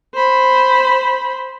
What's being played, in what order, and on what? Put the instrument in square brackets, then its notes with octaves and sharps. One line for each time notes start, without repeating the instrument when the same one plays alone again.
[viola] C5 B5